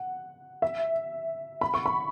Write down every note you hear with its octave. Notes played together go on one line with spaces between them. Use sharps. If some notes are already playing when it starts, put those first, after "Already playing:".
Already playing: F#5
E5
B5
C#6
B5